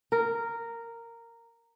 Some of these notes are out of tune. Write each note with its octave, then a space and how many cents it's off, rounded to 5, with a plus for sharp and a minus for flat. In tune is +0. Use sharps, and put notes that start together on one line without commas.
A#4 -10